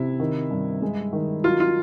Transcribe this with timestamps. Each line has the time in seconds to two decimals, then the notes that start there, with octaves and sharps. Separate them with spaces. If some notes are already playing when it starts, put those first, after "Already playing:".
Already playing: C3 E4
0.20 D#3
0.51 G2
0.82 G#3
1.13 D#3
1.44 F#3 F4
1.60 F4